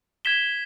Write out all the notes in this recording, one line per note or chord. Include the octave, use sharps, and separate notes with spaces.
G#6 B6 E7 G7